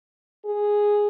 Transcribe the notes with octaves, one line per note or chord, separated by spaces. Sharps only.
G#4